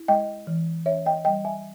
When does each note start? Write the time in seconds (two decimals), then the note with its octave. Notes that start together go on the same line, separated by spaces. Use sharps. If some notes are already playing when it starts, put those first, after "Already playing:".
Already playing: E4
0.08 G#3 D#5 G5
0.47 E3
0.86 C#4 C#5 E5
1.06 D#5 G5
1.25 G3 D#5 G5
1.45 E5 G#5